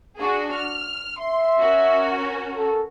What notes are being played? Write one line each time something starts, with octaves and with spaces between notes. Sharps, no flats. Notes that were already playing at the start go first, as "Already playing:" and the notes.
D4 F#4 G#4
F6
E5 C6
C#4 F#4 A#4
A4